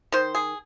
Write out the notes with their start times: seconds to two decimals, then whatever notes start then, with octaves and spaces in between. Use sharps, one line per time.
0.12 D#3 C5
0.35 G#4